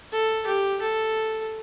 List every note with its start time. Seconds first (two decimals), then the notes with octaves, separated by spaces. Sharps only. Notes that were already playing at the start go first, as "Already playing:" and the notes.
0.13 A4
0.46 G4
0.81 A4